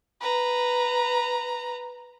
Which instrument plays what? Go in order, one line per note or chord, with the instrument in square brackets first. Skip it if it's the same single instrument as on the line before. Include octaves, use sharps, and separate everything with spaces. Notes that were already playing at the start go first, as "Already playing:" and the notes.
[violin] B4 A#5